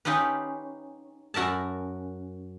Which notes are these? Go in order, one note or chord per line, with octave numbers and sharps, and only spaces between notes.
C#4 D#4 F4 G4 B4
F#2 F#4 A#4 E5 A5